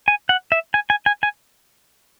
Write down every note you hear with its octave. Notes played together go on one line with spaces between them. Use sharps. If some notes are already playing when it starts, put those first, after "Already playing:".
G#5
F#5
E5
G#5
G#5
G#5
G#5